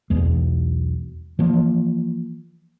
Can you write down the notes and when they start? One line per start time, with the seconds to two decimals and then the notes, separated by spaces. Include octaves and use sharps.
0.10 B1 E2 G#3
1.39 E3 F3 A#3